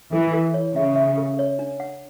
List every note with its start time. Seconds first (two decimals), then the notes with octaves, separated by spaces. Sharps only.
0.12 E3 A4
0.33 A4
0.54 C#5
0.75 C#3 E5
0.96 E5
1.17 A4
1.39 C#5
1.59 D4
1.80 F#5